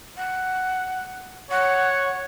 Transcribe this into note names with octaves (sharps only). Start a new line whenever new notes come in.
F#5
C#5 F#5